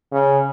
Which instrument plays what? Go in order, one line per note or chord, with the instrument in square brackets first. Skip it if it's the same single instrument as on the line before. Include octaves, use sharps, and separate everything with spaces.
[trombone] C#3